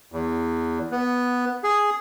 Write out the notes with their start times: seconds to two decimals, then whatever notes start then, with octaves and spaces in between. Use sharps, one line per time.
0.12 E2
0.91 B3
1.64 G#4